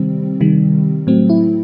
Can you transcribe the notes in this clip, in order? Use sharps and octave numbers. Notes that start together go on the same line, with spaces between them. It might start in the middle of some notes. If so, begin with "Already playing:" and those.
Already playing: C3 D#3 G3 C4
C3 D#3 G3
A2 F#3 A3 C4
E4